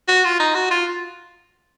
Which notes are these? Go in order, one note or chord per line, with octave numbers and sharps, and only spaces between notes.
F#4
F4
D#4
F#4
F4